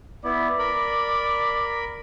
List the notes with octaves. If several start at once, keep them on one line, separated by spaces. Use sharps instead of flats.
B3 E4 D5
A#4 B5